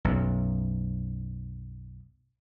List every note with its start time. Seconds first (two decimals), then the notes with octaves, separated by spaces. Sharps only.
0.05 B1 F#2